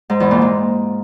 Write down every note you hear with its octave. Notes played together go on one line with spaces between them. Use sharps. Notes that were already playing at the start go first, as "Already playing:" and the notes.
G#2
E2
A#2
G#2